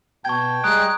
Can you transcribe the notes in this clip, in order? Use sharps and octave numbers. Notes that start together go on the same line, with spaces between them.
B2 G5 A5 C#6 G#6
G3 G#3 A#5 D#6 F#6 D7